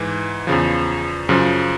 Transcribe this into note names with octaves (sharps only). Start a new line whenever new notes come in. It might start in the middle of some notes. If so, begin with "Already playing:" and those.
Already playing: G#2 E3
E2 C#3 F3
F#2 C#3 F3